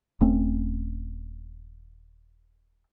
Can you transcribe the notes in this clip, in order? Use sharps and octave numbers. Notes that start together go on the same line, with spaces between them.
D#1 A3 C4 C#4